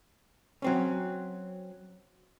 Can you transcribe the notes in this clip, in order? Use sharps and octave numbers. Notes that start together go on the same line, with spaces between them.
F#3 C4 C#4